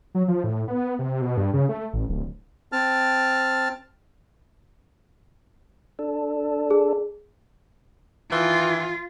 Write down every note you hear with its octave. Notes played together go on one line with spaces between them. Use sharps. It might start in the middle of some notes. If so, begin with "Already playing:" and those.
F#3
F3
A2
B3
C3
B2
G2
C#3
A3
A1
D1
C4 A5 F6
D4 A4
G#4
D#3 E3 F4